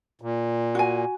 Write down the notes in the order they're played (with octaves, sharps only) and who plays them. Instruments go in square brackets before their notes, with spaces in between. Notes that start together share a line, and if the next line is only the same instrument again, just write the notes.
[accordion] A#2
[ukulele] F#4 G#5